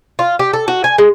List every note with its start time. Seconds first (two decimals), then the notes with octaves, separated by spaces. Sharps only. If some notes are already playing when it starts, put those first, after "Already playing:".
0.19 F4
0.39 G4
0.53 A4
0.68 F#4
0.84 G#5
0.98 G#3